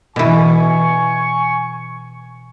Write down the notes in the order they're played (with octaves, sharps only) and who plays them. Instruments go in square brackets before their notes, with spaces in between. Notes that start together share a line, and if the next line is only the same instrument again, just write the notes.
[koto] B2 E3 [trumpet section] G#5 C#6